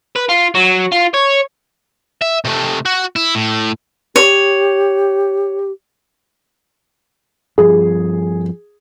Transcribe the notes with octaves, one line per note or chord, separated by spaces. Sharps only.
B4
F4
F#3
F4
C#5
E5
C3 A3
F#4
E4
A2
G4 C#5
G2 F3 G#4